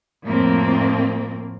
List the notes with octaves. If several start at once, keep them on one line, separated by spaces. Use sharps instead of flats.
F2 A2 A#3 C4